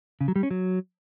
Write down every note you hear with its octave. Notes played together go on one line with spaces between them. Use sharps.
C#3
F#3
G3
C#4
F#3